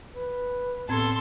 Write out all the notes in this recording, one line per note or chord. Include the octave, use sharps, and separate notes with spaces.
B4
A2 B3 C4 A4 C6 G#6